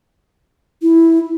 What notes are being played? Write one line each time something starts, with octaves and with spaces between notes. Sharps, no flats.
E4